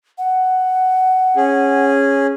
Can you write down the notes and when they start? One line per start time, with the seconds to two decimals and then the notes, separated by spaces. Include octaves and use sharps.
0.18 F#5
1.36 C#4 G#4